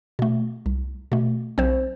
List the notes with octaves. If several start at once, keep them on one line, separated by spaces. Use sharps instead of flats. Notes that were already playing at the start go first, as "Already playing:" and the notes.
B2 A3
C2
B2 A3
B1 C4 C5